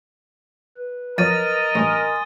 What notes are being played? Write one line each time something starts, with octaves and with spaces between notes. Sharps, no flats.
B4
F2 F3 F#3 A#4 D#5 A6 D#7
A1 G2 G#5 C6 D#6